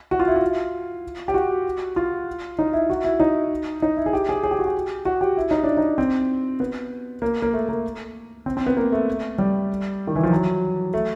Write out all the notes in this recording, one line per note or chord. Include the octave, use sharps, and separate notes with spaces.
F#4
F4
E4
F4
G4
F#4
F4
D#4
E4
F#4
E4
D#4
D#4
E4
G#4
G4
G#4
G#4
G4
F#4
G4
F#4
G4
E4
D#4
D4
D#4
C4
B3
A#3
A#3
A3
A#3
C4
C4
B3
A#3
A3
G3
D#3
E3
F3
F#3
A3